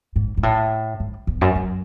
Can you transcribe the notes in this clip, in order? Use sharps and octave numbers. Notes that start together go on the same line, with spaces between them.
G#2
G#2
A2
G#2
E2
F#2
F#2